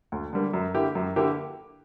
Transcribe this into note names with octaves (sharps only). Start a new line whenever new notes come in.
D2
D3 G3 A#3
F#2
D3 A#3 E4 G4
F#2
D3 A#3 E4 G4